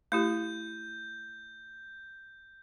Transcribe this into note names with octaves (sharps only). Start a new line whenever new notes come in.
A3 E4 G4 G6